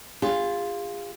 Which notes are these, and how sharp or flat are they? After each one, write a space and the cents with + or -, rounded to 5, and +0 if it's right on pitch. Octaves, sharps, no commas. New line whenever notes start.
F4 +0 G#4 -40